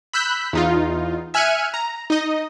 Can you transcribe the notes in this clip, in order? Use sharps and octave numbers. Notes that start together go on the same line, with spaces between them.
B5 E6 F#6 G6 B6
E2 D#4 F4
E5 G#5 F6 F#6 C#7 D#7
A#5
D#4 D#5